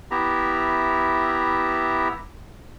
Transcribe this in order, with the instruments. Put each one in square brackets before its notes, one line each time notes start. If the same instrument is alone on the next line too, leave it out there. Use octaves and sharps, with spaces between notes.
[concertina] B3 E4 G4 E5 A#5